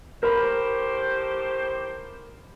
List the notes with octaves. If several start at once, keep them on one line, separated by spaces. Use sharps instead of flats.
A2 G4 A#4 C5 B5